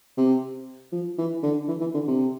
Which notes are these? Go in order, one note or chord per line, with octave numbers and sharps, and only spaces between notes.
C3
F3
E3
D3
E3
E3
D3
C3